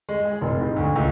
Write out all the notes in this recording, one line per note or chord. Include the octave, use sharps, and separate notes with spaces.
G#3
G#4
F1
G#2
D2
C#2